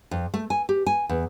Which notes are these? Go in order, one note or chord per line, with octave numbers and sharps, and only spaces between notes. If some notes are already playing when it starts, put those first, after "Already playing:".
F2
A3
G#5
G4
G#5
E2